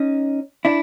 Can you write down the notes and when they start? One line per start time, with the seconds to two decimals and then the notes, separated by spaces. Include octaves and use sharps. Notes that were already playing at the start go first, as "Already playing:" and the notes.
Already playing: C#4 D#4
0.65 D4 E4